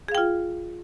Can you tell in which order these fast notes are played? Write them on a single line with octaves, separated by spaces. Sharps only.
G#4 F5 G5 F4